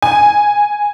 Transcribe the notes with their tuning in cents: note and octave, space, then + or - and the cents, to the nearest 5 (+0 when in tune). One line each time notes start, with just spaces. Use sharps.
G#5 -10